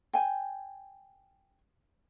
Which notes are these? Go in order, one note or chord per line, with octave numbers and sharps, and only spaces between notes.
G5 G#5